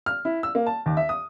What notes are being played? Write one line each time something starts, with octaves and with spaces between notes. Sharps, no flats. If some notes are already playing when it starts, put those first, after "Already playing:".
F6
E4
E6
A#3
A5
D#2
E5
D#6